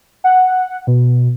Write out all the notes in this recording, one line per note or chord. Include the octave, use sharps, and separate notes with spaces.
F#5
B2